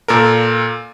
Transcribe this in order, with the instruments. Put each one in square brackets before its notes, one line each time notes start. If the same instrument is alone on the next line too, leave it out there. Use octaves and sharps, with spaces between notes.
[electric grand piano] A#2 A4 A#4